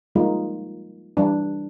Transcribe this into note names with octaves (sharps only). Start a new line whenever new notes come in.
F3 G3 G#3 A#3 D#4 F4
E3 G3 D4